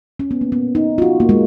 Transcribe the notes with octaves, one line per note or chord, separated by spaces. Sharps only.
C#4
B3
A#3
B3
D#4
F4
F#4
A#3
G#3